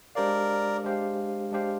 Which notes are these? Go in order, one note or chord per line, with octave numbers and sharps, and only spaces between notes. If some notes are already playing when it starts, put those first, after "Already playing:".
G#3 D4 G4 A#4 C5 D5 F5
G#3 D4 G4 C5 F5
G#3 D4 G4 C5 F5